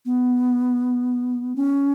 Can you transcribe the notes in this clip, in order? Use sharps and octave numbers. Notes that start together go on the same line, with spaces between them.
B3
C#4